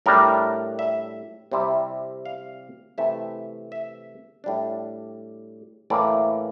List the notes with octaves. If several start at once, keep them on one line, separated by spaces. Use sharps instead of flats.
A2 G3 D4 A#4
E5
C3 G3 C4 E4
F5
C3 E3 A3 E4 E5
E5
A2 G3 D4
A2 E3 A#3 D5